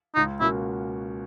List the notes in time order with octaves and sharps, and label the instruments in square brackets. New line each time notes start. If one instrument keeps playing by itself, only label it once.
[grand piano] C#2 [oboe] D#4
[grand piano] B2 A#3 C#4 F#4 [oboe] E4